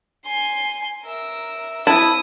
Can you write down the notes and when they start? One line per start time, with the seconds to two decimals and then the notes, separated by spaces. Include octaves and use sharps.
0.25 G#5 C6
1.04 A#4 E5
1.87 C4 E4 A5 D#6